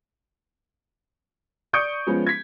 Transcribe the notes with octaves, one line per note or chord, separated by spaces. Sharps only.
D5 C#6 D#6 G6 C#7 D7
F3 G#3 B3 C#4
G#6 B6